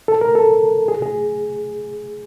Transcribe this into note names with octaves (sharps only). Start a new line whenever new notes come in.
A4
A#4
A4
G#4
G#4